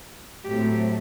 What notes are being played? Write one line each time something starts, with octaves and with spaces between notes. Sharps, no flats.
A2 F#3 A3 C4 G4